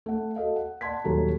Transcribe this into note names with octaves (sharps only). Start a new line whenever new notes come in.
A3 F#5
F#4 A4 D#5 F5
F#5
D5 F#5 A5 C6 G#6 B6
D#1 D#2 F#3 G4 A4 A#5